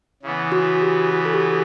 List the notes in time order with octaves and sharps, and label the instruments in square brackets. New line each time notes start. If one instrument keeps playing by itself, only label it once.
[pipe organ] C#3 E3 B3
[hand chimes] F#4
G4
F#4
A4
G4